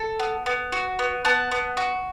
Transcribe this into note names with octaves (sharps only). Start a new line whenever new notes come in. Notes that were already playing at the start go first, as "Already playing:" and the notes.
Already playing: A4
B3
B3
F#4
B3
B3 F#5 A5
B3
F#4